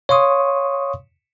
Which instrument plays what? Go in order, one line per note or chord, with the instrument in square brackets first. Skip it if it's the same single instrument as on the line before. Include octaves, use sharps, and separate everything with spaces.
[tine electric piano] C#5 F5 C6 C#6 D#6